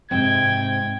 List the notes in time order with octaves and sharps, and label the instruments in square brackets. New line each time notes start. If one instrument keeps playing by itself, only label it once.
[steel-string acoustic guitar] G#2 C3 C4 [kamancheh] G5 [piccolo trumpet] G#6